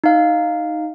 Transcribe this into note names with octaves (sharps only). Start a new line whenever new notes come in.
D#4 F5